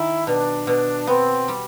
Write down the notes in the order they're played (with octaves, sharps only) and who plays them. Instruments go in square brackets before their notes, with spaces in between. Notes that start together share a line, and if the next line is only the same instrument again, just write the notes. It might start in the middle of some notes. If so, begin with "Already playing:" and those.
Already playing: [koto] D#3 [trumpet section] E4
[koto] B2 [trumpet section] D4
[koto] B2
[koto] B3 [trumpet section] C4
[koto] G3